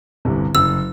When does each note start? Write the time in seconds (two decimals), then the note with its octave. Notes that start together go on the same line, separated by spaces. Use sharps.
0.25 G1 C2 C3
0.55 F#1 E6